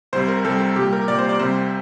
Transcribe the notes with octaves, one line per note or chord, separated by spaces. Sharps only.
C2 C3 G3 C5
A#4
C2 C3 G3 A4
C2 A#2 G3 G4
A#4
C2 A#2 G3 D5
C5
D5
C2 C3 G3 C5